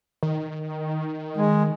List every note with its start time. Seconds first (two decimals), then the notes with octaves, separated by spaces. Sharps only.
0.23 D#3
1.37 G#3